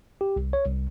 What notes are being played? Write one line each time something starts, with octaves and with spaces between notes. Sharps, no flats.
G4
C2
C#5
C2